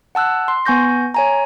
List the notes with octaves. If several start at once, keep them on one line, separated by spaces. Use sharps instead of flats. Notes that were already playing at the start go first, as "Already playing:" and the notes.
F#5 A5 E6 F#6
C6
B3 G#5 C#6 G6 A#6
C#5 G#5 A#5